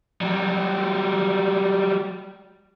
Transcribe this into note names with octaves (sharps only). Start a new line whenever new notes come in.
F#3 G3